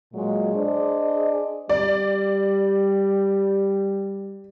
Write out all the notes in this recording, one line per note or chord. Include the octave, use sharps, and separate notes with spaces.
A#2 F#3 G#3
D4 G#4 C5 D5 D#5
G3 D5